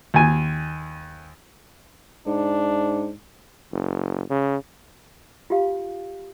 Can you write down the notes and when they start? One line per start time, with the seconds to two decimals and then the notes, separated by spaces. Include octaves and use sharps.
0.14 D#2 G#5
2.27 G#2 D4
3.72 F#1
4.30 C#3
5.50 F4 G4 F5